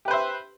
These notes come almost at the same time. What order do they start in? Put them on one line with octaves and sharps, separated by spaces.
G4 B4 C5 E5